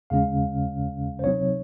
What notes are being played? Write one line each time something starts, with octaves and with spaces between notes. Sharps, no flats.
D#2 C#3 G#3 C#4 F5
C5
C#2 C3 F#3 C4 D#4 C#5